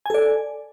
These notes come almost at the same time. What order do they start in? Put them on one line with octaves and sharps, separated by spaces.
G#5 A4 D5